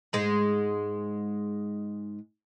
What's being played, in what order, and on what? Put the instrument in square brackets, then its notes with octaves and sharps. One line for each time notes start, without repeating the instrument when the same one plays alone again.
[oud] G#2 G#3